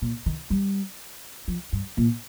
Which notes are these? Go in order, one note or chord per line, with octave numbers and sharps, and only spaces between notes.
A#2
D#3
G3
F3
G2
A#2